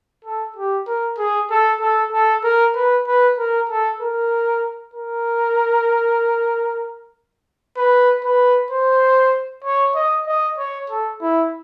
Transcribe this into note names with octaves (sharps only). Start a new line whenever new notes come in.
A4
G4
A#4
G#4
A4
A4
A4
A#4
B4
B4
A#4
A4
A#4
A#4
B4
B4
C5
C#5
D#5
D#5
C#5
A4
E4